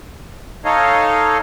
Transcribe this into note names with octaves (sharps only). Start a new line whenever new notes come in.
D#4 A4 C#5 D#5 F5